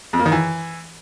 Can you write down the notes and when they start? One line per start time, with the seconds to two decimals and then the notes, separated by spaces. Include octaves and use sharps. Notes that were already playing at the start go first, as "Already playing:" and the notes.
0.13 F2
0.19 A#3
0.26 D#3
0.32 E3